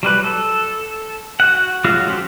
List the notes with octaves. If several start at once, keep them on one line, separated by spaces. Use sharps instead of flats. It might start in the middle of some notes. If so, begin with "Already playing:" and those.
F#3 G3 B4
A4
F#4 F#5
F#3 G#3 F4 F#4
F3 F#3 C#4 G4